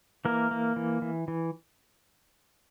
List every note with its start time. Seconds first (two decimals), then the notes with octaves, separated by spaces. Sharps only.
0.25 E3 A#3 A#4
0.51 A#3
0.76 E3
1.02 E3
1.28 E3